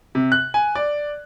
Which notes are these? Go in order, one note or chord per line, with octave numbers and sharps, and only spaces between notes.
C3
F#6
G#5
D5